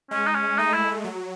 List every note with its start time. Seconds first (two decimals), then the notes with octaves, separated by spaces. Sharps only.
0.11 G#3 C#4
0.27 D#4
0.35 C#4
0.58 A3 D#4
0.74 E4
1.04 F#3